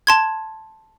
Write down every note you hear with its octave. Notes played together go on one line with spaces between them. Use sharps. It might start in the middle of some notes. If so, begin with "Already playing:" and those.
A5 C6 G#6